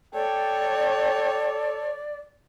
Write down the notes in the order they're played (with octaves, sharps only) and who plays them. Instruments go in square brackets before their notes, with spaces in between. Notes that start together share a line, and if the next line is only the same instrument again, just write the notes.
[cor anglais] A4 [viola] C#5 [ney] D5 [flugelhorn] G5